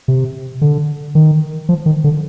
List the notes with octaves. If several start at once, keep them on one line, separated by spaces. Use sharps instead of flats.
C3
D3
D#3
F3
D#3
D3